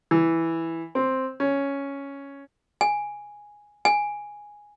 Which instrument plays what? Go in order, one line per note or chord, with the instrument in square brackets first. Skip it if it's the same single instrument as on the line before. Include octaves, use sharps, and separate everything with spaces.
[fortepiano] E3
C4
C#4
[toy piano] G#5
G#5